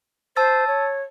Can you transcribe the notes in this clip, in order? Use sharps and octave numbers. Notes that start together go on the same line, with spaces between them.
C5 A5 E6 A6
C#5